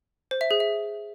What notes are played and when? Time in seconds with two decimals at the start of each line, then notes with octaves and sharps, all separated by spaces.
0.31 C5
0.41 E5
0.51 G#4
0.60 E5